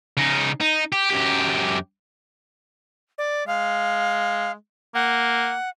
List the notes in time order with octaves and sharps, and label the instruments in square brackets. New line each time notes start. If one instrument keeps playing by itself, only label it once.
[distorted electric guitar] C#3 D#4
D#4
G4
F#2 G4
[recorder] D5
[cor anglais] G#3 [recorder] F5
[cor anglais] A#3 [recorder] F#5